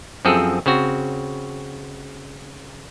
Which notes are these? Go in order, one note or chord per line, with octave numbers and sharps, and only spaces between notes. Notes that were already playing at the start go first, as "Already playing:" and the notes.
F#2 F3 C4 G#4 A4
C#3 C4 F#4